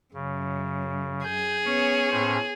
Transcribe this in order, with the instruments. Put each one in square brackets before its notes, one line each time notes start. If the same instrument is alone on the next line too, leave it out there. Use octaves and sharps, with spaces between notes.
[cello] F#2 [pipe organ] C#3
[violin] G#4 [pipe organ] G6
[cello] B3 C#5 [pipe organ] C#4
[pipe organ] A2 C#4 C5